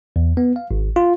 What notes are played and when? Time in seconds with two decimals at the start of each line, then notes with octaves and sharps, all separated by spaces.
0.16 E2
0.37 B3
0.56 F5
0.71 G#1
0.96 F4